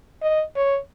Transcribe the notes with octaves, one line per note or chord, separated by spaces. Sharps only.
D#5
C#5